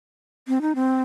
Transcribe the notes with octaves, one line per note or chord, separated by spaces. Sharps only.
C4
D#4
C4